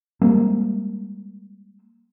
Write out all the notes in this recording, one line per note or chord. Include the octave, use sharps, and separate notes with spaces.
G3 G#3 A#3 C4